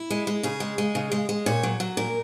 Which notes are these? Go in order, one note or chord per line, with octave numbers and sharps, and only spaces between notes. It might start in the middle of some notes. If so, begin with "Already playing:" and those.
Already playing: E4
G#3
G#3
C#3 G#4
G#3
G#3
C#3
G#3
G#3
A#2 C#5
F#3
F#3
A#2 A#4